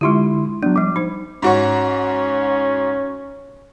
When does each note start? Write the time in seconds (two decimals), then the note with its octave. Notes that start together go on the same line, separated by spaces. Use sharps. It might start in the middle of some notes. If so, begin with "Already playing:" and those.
0.01 D3 G#3 E4 F4 G4 C6
0.63 F#3 B3 D4
0.76 F3 G3 D6
0.96 D#4 C5
1.42 G#2 C#4 F#4 C#6